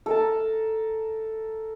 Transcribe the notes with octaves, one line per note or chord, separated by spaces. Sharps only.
A4 A#4 A5